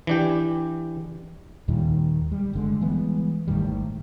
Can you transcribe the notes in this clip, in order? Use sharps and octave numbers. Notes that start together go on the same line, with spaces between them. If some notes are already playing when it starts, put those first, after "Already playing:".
E3 D4 G4
D#2 A#2 D#3 G3
G3
G1 D3 G#3
E3 G3 G#3 B3
G#1 A2 D#3 G3